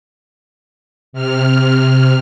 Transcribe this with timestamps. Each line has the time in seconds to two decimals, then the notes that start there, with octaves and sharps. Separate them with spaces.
1.13 C3 F6